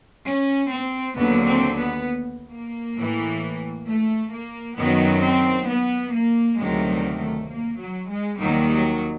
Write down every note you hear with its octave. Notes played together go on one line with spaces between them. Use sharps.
C#4
C4
D#2 D3 F#3 B3
C4
B3
A#3
A2 E3
A3
A#3
F#2 D#3 F#3 B3
C4
B3
A#3
D2 C3 D#3 F#3 G#3
G3
A3
A#3
F#3
G#3
D#2 D#3 F#3 G3
F#3